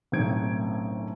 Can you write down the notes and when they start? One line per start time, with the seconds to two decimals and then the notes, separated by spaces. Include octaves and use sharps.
0.12 F#1 B1 A2 C4 G#6 D7